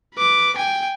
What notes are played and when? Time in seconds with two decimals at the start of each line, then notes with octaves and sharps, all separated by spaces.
0.15 B4 D6
0.56 G5 G#5